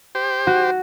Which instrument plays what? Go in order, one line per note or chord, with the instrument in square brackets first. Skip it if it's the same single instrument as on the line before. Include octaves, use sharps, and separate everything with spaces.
[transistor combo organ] G4 C5
[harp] F#4